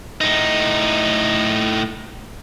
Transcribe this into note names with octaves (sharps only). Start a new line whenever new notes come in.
A2 D#4